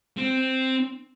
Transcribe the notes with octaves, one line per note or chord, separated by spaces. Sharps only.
C4